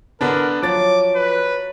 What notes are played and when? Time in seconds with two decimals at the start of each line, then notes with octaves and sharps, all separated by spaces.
0.21 D3 B3 D4 A#4
0.63 F3 F#3 D6 A6
1.16 B4